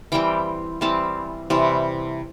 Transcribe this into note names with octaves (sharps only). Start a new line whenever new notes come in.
E3 G3 C4 G5
E3 G3 C4 A5
C3 E3 G3